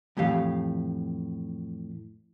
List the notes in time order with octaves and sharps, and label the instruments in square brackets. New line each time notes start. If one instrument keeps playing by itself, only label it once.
[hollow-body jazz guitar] F2 A2 E3 G4 F5